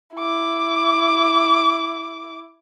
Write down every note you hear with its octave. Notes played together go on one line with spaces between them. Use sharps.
E4 D6